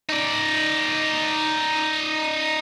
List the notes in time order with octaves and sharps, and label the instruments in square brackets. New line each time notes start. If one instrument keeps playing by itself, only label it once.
[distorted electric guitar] D#4 D5